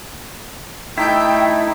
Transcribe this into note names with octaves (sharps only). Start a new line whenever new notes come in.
A3 D#4 E4 G5